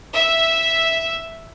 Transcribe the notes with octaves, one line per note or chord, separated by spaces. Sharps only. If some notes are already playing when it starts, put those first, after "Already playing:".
E5